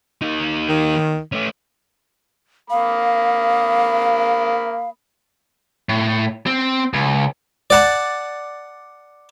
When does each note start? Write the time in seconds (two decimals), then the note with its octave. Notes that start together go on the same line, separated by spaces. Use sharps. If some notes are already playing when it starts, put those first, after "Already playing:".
0.21 D#2 D#4
0.69 D#3
1.32 A3 C#4
2.70 A#3 F5 B5 D#6
5.89 A2
6.47 C4
6.93 C#2
7.70 D5 F#5 A5